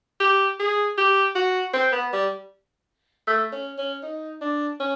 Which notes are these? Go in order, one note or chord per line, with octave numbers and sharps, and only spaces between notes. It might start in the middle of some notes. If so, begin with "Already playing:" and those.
G4
G#4
G4
F#4
C4
B3
G3
A3
C#4
C#4
D#4
D4
C#4